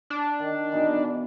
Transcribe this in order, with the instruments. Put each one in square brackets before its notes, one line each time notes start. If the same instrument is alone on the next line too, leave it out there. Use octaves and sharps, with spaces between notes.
[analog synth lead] D4
[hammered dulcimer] D#3
[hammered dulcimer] B2 E3 [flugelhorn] D#4